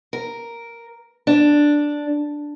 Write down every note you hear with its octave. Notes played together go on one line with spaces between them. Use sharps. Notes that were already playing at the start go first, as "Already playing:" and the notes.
A#4
D4